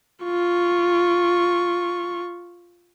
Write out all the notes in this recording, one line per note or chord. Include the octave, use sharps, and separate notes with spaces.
F4 C#6